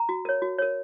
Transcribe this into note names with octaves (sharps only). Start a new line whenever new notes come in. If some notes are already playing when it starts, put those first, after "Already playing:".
Already playing: A#5
F#4
A#4 C#5
F#4
A#4 C#5